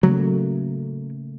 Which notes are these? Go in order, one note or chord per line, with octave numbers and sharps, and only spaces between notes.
C#3 F#3 A3 A#3